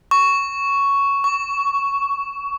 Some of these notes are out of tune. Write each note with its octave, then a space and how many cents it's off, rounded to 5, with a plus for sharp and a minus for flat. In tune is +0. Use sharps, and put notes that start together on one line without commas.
C#6 +5
C#6 +25